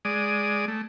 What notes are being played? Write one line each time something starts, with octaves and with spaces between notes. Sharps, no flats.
G#3 D5 D#6
A3